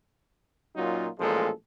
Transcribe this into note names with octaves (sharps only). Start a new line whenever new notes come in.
F#2 A#2 F#3 D#4 F4
A1 A#2 F3 G#3 A4